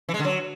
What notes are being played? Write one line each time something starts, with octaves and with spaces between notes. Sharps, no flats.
E3
G#3
D3
F#3